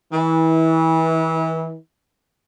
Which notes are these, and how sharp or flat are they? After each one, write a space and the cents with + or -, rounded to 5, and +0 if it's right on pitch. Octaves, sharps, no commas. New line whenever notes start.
E3 -30